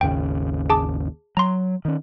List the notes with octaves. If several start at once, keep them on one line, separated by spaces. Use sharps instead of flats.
G#1 D#2 C#3 G5
G#4 A5 D6
F#3 A#5 C6
D#3 C#4